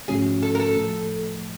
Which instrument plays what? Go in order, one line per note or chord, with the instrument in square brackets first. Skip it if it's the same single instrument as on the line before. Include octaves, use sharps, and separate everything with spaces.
[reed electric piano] G#2 F3 A3 C#4 F#4 [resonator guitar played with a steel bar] G#4
[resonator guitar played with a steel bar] A4
A#4
A4
[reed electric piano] A2 F3 A3